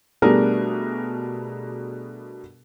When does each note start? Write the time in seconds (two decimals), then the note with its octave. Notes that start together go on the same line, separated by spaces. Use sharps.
0.22 B2 G3 A3 D4 G#4 A#4